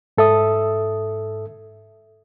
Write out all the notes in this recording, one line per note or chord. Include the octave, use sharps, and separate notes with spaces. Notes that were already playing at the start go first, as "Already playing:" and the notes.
G#2 A4 E5 D#6